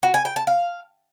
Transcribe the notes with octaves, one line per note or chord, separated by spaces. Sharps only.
F#4
G#5
G5
A5
F5